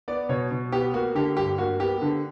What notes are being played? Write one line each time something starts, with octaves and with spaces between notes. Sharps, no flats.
B3 D5
B2 C#5
B2
B3 G4
A#3 F#4
D3 G4
G2 G4
A#3 F#4
B3 G4
D3